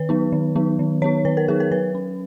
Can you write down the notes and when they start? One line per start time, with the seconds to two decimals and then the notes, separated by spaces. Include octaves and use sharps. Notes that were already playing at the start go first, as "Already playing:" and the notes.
Already playing: D#3 B4
0.09 F#3 B3 D#4
0.32 D#3
0.56 F#3 B3 D#4
0.79 D#3
1.02 F#3 B3 D#4 C#5
1.25 D#3 B4
1.37 A#4
1.48 F#3 B3 D#4 G#4
1.60 A#4
1.71 F#3 B4
1.95 C#4